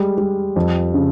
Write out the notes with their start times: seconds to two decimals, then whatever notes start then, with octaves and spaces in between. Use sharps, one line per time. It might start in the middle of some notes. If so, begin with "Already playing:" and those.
Already playing: G3 G#3
0.18 G3
0.56 F2
0.94 C#3